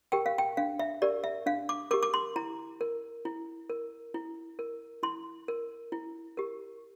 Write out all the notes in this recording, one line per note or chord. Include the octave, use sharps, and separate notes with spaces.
G4 A#4 G5
F5
G5
D4 F5
E5
G4 A#4 D5
E5
D4 F5
D6
G4 A#4 D6
D6
C6
E4 A#5
A#4
E4
A#4
E4
A#4
E4 C6
A#4
E4
G4 A#4